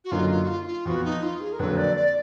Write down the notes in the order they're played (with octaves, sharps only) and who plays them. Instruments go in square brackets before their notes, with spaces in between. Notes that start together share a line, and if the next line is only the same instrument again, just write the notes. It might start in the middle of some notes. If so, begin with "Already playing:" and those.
[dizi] F#4
[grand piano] F#2 D3 F#3 A#3 D#4 [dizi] F4
[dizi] F4
F#4
F4
D#4
F4
[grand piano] F2 F3 B3 [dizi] F#4
[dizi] D#4
F4
G#4
A#4
[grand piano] F2 D3 F#3 A#3 [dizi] B4
[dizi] D5
D5